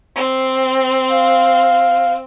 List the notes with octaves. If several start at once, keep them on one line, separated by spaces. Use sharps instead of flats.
C4
F5